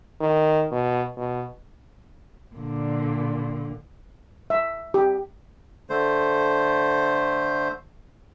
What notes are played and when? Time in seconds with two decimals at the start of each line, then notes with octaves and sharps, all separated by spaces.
0.21 D#3
0.72 B2
1.17 B2
2.56 A#2 D3
4.50 E5
4.94 G4
5.90 D3 A3 C5